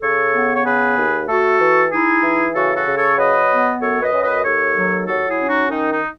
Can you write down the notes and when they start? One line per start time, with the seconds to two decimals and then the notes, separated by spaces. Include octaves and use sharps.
0.01 C#3 A4 C#5
0.33 B3
0.54 C#5
0.64 C#3 G#4 B4
0.96 D#2
1.27 A3 F#4 A4
1.59 E3
1.90 D#4 E4 G#4
2.22 E3
2.53 C#3 F#4 A4
2.76 F#4 A4
2.86 C#3
2.96 A4 C#5
3.17 F#3 B4 D#5
3.49 B3
3.80 F#2 A4 C#5
4.01 B4 D#5
4.12 F#2
4.22 B4 D#5
4.43 D#2 A4 C#5
4.74 F#3
5.06 F#3 F#4 A4
5.27 E4 G#4
5.38 C#4
5.48 D#4 F#4
5.69 D#3 D#4
5.91 D#4